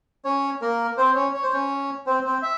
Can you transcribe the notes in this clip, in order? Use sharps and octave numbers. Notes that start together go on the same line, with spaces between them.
C#4 C#5
A#3 A#4
C4 C5
C#4 C#5
C#5
C5
C#4 C#5
C4 C5
C4 C5
E5